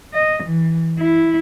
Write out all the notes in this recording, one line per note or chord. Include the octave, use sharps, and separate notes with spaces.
D#5
E3
E4